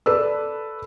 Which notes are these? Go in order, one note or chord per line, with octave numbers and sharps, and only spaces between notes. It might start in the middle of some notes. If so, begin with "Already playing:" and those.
A4 B4 D5 E6